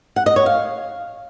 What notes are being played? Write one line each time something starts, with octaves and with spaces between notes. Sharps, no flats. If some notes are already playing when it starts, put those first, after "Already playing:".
F#5
D#5
C#5
F5